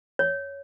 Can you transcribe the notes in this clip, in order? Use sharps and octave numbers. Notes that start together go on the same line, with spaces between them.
C#5